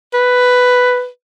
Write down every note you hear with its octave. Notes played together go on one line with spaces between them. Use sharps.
B4